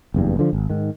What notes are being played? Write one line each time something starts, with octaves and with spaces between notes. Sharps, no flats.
F#1 E2 G2
D3 F3
G#1
G#2 D#3